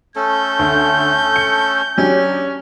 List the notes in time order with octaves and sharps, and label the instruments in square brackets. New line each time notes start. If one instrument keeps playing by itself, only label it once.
[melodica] A3 C#4 A4 [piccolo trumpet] G6
[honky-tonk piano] D2
C#7
[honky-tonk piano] F#3 D4 G4 [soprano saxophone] C#4